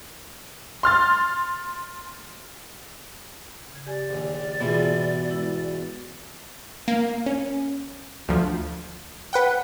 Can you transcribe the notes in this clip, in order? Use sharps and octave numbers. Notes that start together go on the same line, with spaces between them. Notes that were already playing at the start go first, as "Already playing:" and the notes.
C6 F6 A6
C#3 G#6
G4 D5 G#5
A#1 D#2
G#2 B2 E3 G3 B3 F4 G#4
G#3 E4
A#3
C#4
D2 F3
B4 F#5 G5